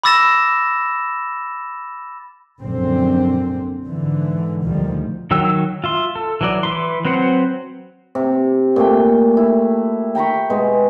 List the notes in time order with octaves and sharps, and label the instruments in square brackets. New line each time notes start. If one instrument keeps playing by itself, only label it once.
[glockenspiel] B5 D6 E6 A6 A#6 E7
[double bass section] A#1 F#2 A#2 D3 C4
G#2 D3 E3
D2 A#2 D#3 F3 G3
[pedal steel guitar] D#3 F#3 G5 E6
F4 E5 C6
A4
E3 F#3 D5
E3 B4 C6
F#3 C4 B4 C5 F#5
[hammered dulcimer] C3
A#2 A3 G5
E4
G5 A#5 B5 C#6
B2 G#3